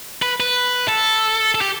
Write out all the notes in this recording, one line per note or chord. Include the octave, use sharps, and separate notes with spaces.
B4
B4
A4
A4
G4